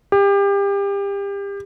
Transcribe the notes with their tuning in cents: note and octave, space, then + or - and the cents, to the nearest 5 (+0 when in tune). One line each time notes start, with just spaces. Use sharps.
G4 +30